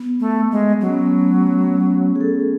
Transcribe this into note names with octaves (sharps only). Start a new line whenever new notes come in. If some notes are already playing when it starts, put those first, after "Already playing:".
Already playing: B3
A3
G#3
F#3 C#4
B3
A3
B3
C#4
G#4
A4